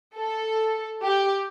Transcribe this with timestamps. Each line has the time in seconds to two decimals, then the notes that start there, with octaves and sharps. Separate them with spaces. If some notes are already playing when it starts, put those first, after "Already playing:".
0.17 A4
1.03 G4